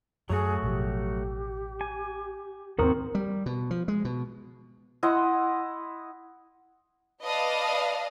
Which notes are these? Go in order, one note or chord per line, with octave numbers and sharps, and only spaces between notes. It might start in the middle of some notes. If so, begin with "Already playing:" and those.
F#2 F#3 A3 F#4 G#4
A1 B2 F3 G4
G#5
D#2 G#2 D#3 A#3 C4 F#4 A#4 D#6
G3
B2
F3
G#3
B2
E4 D#5 F#5 C6
B4 D5 D#5 F5 A5 D#6